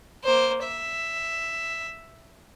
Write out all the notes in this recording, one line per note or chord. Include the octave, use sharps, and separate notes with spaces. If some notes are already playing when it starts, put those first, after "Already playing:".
A#3 C5
E5